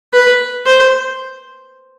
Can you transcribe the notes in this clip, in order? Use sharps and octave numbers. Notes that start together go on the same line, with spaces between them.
B4
C5